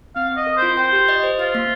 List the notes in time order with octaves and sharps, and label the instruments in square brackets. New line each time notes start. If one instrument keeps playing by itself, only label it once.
[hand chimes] C4 [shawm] F5
[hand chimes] C4
[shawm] D#5
[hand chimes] A#4
[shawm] C5
[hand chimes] F4
[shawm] C5 [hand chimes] G5
[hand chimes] G4
D#5
C5
[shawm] F4 [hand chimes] C5
[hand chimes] A#3